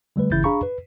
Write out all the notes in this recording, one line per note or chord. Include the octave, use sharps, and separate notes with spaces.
D3 G3 A3 B4
G1 C#3 E3 E4 G6 A6
D4 G#4 F5 A#5 B5 C#6
B4